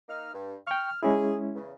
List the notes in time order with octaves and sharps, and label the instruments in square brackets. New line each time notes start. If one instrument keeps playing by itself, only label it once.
[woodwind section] A#3 D#4 F6
G2
[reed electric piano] G5 C#6 [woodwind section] F6
[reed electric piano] G#3 C#4 E4 [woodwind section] G#4
[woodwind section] E2 C#3